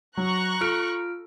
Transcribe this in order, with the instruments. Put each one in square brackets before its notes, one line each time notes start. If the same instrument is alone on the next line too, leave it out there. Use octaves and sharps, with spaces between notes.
[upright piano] F#3 [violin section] A#5 C#6 F#6
[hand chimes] F4 F6 D7 [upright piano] A4